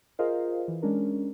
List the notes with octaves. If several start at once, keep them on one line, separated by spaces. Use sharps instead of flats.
F4 G#4 A#4 C5 D#5 F5
E3
G#3 C#4 D4 A#4